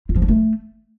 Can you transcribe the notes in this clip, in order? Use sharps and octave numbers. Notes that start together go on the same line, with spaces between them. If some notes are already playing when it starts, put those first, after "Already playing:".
F4
F3
D4
A3